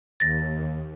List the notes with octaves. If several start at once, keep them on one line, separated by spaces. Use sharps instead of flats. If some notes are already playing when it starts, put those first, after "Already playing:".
D#2 A6 A#6